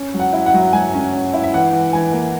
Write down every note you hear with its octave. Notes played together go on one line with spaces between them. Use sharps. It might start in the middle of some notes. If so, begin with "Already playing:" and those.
Already playing: C#4
F#3
F#5
E4
F#5
F#3
F#3 G#5
C#4
C#4
E4
E5
E3 F#5
E3
E3 G#5
A#3